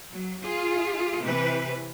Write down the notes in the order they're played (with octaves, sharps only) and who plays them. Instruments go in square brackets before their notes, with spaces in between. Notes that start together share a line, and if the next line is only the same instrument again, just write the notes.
[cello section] F#3
F4 G#4
C3 E3 B4